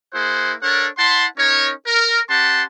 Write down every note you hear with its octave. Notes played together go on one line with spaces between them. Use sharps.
A#3 E4 G#4 C5 F#5
D4 A4 A#4 C#5 F#5
E4 F#5 A5 C6
C#4 D#4 A#4 C#5
A#4
C#4 G4 F#5 A5 C6